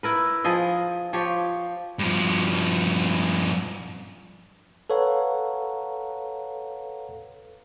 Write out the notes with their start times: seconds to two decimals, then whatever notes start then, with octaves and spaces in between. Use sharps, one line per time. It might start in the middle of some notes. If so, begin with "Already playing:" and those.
0.03 E4 A#4 B4
0.44 F3 G#4 D#5
1.13 F3 G4 C#5
1.99 G2 F3
4.90 A4 B4 C#5 F5 F#5 A#5